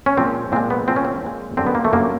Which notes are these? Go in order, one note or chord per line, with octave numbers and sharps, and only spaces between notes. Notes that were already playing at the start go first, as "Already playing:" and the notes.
C#4
A#2 F3 G#3 C4
A#2 F3 G#3 C4
B3
A#2 F3 G#3 C4
C#4
C4
A#2 F3 G#3
F#2 D3 G3 C4
B3
A#3
A3
F#2 D3 G3 A#3